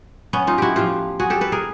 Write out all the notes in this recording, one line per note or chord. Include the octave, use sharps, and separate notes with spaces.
B3 C#4
D#4 F4
E4 F#4 G4
A2 F3 F4 G4
F#4 G#4
G4 A4
A4 B4
G#4 A#4